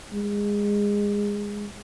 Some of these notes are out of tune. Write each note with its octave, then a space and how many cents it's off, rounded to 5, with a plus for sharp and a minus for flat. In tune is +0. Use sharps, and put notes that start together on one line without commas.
G#3 -20